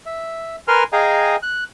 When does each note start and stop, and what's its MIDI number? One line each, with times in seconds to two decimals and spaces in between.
0.06 0.56 76
0.68 0.84 70
0.68 0.84 71
0.68 0.84 80
0.68 0.84 84
0.68 0.84 89
0.93 1.36 68
0.93 1.36 75
0.93 1.36 77
0.93 1.36 79
0.93 1.36 80
0.93 1.36 82
1.43 1.64 90